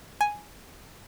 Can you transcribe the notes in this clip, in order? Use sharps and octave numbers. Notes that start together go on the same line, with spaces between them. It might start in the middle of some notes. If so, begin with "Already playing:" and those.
G#5